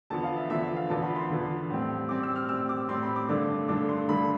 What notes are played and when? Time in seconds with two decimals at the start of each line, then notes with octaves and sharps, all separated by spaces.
0.10 E2 D3 F3 B3 A5
0.24 F5
0.36 E5
0.49 E2 D3 F3 B3 E5
0.63 E5
0.76 F5
0.89 E2 D3 F3 B3 A5
1.03 B5
1.16 C6
1.30 E2 D3 F3 B3
1.70 A2 G3 C4
2.09 A2 G3 C4 D6
2.23 E6
2.36 F6
2.49 A2 G3 C4 E6
2.69 D6
2.89 A2 G3 C4 C6
3.03 B5
3.16 D6
3.29 G2 D3 A3 D4 D6
3.68 G2 D3 A3 D4 D6
3.89 C6
4.09 G2 D3 A3 D4 B5